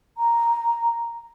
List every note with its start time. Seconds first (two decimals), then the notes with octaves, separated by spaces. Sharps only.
0.18 A#5